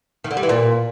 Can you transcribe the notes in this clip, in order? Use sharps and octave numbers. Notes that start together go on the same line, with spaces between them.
D#3
D3
G3
E3
A#2